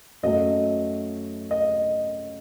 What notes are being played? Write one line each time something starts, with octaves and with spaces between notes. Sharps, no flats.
F#2 F#3 A3 D#5
D#5